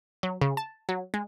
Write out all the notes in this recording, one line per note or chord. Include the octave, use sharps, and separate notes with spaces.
F#3
C#3
A5
F#3
G#3